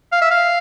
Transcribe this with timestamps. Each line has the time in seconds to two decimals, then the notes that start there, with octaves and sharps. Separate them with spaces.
0.12 F5
0.22 E5
0.31 F5